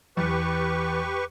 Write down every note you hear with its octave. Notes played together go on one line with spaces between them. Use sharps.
E2 G4 B4 C#6